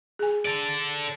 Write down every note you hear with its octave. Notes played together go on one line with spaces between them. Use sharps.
G#4 G#5
A4 D5